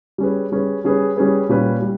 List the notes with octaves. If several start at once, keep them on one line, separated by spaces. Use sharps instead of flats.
G3 C#4 G#4 B4
G3 C#4 G#4 B4
G3 C#4 G#4 B4
G3 C#4 G#4 B4
A#2 G3 C#4 G4 B4
G3